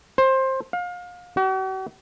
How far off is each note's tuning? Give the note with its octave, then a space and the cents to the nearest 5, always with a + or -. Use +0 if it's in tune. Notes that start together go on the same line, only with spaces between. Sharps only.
C5 +20
F5 +30
F#4 +45